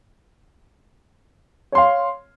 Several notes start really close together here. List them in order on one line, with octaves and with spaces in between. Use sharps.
C#5 C6 F5